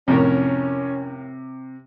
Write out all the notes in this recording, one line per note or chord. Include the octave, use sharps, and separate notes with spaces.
F2 A2 C3 C#4 A#4